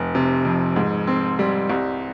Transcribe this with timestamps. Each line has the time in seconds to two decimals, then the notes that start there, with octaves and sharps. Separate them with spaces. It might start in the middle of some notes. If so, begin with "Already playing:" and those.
Already playing: F1
0.15 C3
0.45 F2
0.76 G#2
1.07 C4
1.39 G3
1.70 C2